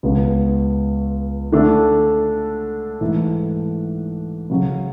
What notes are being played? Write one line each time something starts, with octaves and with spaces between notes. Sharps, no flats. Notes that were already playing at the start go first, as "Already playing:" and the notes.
C#2 C#3 G#3 B3 D4
D3 A3 D4 A4
G#2 E3 A3
C#3 F#3 C#4